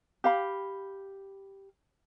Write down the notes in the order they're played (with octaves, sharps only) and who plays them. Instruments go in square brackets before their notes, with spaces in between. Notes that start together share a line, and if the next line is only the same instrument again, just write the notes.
[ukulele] G4 F5 B5